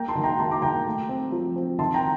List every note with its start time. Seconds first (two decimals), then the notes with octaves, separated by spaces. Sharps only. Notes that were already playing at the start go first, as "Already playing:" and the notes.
Already playing: A#3 G5 A#5
0.08 A5 C6
0.15 D#3
0.24 G5 A#5
0.39 A#3 A5 C6
0.51 A#5 D6
0.62 D#3 G5 A#5
0.86 A3
1.09 C4
1.32 F3
1.56 C4
1.79 D#3 A5 C6
1.94 G5 A#5